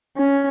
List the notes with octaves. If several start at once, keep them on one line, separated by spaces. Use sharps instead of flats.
C#4